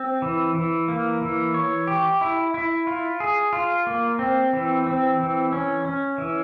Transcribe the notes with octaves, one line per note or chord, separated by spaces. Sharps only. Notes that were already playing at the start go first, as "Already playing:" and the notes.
Already playing: C4
E3
E3
A#3
E3
C#5
G4
E4
E4
F4
G#4
F4
A#3
C4
E3
C4
E3
C#4
C#4
E3